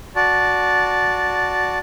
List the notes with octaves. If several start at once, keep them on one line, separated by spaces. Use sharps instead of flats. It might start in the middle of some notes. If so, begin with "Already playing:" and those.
F#4 D5 A5